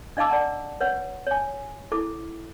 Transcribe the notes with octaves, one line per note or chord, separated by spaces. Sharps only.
D4 D#5 F5 A5 D6 E6
D5 F#5 A#5
B4 C#5 F#5
C#5 G#5
E4 A4 D6